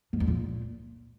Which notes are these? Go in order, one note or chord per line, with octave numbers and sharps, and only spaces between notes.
G#2
F2
A#2